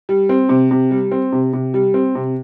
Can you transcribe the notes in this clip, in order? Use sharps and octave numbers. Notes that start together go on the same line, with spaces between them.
G3
C4
C3
C3
G3
C4
C3
C3
G3
C4
C3